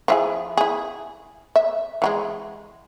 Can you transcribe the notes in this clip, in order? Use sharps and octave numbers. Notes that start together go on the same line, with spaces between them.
F3 E4 G#4
E4 G#4
E5
E3 F#3 G#3